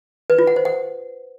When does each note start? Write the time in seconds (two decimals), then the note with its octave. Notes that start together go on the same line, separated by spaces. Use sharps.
0.30 B4
0.39 F4
0.47 F#5
0.56 C5
0.65 F#5